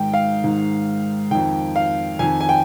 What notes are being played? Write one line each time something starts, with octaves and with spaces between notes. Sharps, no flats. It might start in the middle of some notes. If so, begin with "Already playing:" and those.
Already playing: G#2 D#3 G5
F5
G#2 D#3
F2 D#3 G5
F5
F2 D#3 G#5
G#5
G5